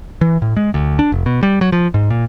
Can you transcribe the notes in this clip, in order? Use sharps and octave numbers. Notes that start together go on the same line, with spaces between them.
E3
A2
G#3
D2
D4
F1
B2
G3
F#3
F3
G#2
A#2